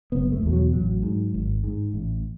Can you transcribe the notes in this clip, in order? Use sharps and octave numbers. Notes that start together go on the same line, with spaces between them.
F#1 B3
A3
E2 B2
F#3
A1 F#3
G#2
G#1
G#2
A1